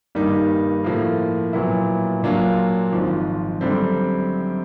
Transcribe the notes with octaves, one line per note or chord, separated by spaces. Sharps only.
G2 D#3 G3 A#3 D#4
A2 F3 A#3
A#2 F#3 B3 E4
A#2 F#3 A#3 D4 F4
G#1 G#2 F3
F#2 D3 G3 C4